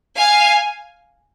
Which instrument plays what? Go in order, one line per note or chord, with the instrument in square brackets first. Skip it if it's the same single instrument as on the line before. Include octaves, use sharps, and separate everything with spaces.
[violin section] F5 G#5